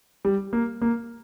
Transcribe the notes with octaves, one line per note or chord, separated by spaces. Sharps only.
G3
A#3
A#3